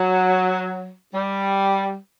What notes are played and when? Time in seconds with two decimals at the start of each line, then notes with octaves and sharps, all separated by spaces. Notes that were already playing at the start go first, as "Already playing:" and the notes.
Already playing: F#3
1.14 G3